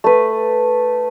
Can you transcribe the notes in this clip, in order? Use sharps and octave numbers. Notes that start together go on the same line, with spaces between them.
A3 B4